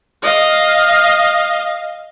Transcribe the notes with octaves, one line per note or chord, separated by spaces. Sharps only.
D#5 F5